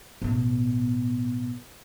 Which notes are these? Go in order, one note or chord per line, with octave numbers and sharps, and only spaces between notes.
A1 B2